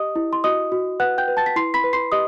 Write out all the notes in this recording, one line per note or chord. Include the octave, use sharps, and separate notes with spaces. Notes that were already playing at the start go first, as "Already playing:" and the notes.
Already playing: G4 D#5 D#6
E4
C6
F#4 D#5 D#6
F#4
B4 F#5 F#6
G5 G6
B4
A5 A6
B6
E4 C6 C7
B5 B6
B4
C6 C7
G4 D#5 D#6